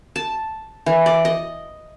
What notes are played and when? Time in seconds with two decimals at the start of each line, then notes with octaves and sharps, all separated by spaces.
0.16 A5
0.86 E3
1.06 D5
1.25 D#5